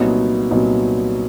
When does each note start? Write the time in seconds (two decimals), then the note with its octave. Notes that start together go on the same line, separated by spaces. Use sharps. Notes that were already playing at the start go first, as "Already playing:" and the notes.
Already playing: C2 A#2 F#3 B3 D#4 C#5
0.51 C2 A#2 F#3 B3 D#4